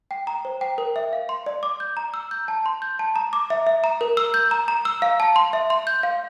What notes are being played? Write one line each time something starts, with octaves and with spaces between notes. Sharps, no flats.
G5
A#5
C5
G5
A#4
E5
F5
C6
D5
D6
G6
A#5
E6
G6
A5
C6
G6
A5
A#5
D6
E5
E5
A#5
A#4
E6
G6
A#5
A#5
E6
F5
A5
C6
E5
C6
G6
F5